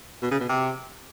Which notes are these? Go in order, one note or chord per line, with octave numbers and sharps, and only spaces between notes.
B2
C#3
B2
C3